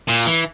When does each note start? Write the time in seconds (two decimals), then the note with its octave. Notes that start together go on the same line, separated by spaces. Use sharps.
0.09 A#2
0.27 E3